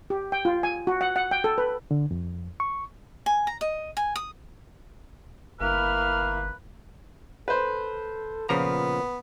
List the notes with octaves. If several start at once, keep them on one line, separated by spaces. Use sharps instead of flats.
G4
G5
F4
G#5
F#4
F#5
F#5
G5
A4
B4
D3
F2
C#6
G#5
A#5
D#5
G#5
D#6
G1 A#3 E4 B4 F6
A4 B4 C5
A#2 C#3 F3 B3 A#5